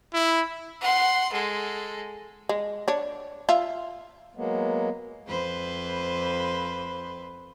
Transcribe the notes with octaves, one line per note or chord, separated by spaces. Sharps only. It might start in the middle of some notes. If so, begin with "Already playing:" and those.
E4
F#5 C6
G#3 A4
G#3
D4 C#5
F4 E5
F#3 G#3 A#3 B3
F2 B4 C5